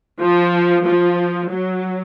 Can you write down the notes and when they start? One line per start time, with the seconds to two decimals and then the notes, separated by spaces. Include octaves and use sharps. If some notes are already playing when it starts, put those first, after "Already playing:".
0.20 F3
0.85 F3
1.50 F#3